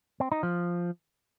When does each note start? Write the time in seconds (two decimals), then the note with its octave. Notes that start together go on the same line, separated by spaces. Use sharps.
0.20 C4
0.32 D#4
0.43 F3